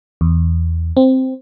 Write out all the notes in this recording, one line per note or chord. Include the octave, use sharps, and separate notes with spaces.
E2
C4